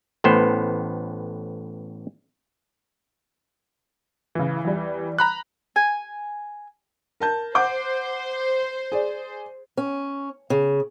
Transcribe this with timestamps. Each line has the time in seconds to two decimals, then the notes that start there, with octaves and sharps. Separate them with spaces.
0.24 A1 A2 B3 C5
4.35 A2 C#3 E3
4.65 E2 G3
5.18 A#5 B5 F#6
5.76 G#5
7.20 A#4 A5 G6
7.55 C5 F#5 D6 G6
8.92 G#4 D5
9.77 C#4
10.50 C#3